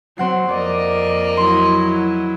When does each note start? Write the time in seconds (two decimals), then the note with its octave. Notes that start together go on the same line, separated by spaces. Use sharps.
0.18 F#3 C4 F#5 C7
0.49 F2 A#3 D5 D#5
1.37 F#3 E4 C6